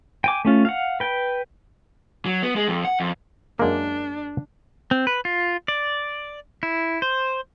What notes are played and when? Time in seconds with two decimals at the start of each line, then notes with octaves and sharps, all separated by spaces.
0.24 G5 G#5 D6
0.45 A3 C#4 F4
0.65 F5 F#5
1.00 B4 G5
2.26 F#3
2.43 B3
2.56 G#3
2.68 F2
2.85 F#5
3.00 F2
3.59 F#2 G#3 A#3 D4
4.91 C4
5.07 B4
5.25 F4
5.68 D5
6.63 E4
7.02 C5